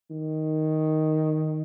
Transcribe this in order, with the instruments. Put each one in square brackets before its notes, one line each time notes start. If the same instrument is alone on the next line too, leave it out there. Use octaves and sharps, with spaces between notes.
[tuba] D#3